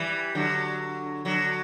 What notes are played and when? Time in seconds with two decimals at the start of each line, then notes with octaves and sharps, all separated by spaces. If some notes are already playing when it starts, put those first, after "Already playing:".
Already playing: E3 G3
0.35 D3 F#3
1.25 D3 F#3